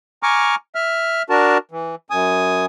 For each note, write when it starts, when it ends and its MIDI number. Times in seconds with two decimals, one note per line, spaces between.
0.23 0.55 80
0.23 0.55 82
0.23 0.55 85
0.23 0.55 86
0.23 0.55 89
0.75 1.22 76
0.75 1.22 89
1.30 1.58 62
1.30 1.58 66
1.30 1.58 70
1.30 1.58 81
1.71 1.95 52
2.10 2.66 42
2.10 2.66 80
2.10 2.66 87